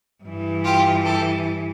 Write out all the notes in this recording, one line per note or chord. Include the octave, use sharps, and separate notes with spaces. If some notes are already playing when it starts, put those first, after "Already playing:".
G2 E3
F4 G4
G4 A4